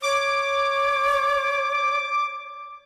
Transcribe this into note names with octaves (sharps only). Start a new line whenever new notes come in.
C#5 D6